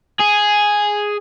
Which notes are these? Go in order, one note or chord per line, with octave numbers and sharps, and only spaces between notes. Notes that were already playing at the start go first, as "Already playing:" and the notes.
G#4